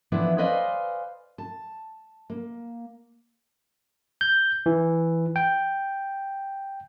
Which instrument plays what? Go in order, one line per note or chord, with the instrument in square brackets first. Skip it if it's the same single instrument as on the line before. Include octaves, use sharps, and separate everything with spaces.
[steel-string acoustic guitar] E3 F3 B3 D4 E4
B4 C5 D5 D#5 F5 G#5
A5
A#3
[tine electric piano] G6
E3
G5